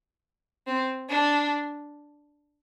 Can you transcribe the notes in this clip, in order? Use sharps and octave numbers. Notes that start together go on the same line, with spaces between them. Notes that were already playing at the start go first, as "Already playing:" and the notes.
C4
D4